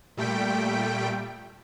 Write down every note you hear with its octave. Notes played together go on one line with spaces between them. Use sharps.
A#2 G3 A3 G5 B6 D7